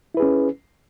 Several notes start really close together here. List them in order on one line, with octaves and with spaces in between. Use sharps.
E4 B4 G#4 C#4